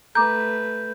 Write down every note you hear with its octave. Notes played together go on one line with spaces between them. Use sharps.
A3 B4 A#5 D6 G6